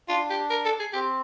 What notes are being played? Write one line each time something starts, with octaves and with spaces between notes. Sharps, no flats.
D4 F4
G4
A#4
A4
G#4
C4 G4